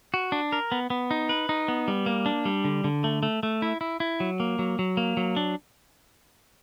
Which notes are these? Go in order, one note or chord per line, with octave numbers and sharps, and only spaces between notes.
F#4
D4
A#4
B3
B3
D#4
B4
D#4
B3
G3
A#3
D4
G3
D3
D3
A3
A3
A3
E4
E4
E4
F#3
A#3
F#3
F#3
A#3
F#3
D4